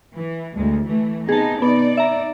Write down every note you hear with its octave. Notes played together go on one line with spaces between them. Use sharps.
E3
D2 G#3
E3 A3
C3 B3 D#4 G#4 A5
B3 D#4 D5
E5 A#5